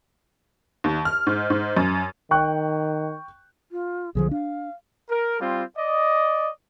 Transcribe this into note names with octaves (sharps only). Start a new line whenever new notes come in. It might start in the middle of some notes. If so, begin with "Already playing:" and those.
D#2
F6
G#2
G#2
F#2
D#3 G5 C#6 F#6
F4
B1 D3 F3 G#4
D4 F5
A#4
G3 C4 F4
D5 D#5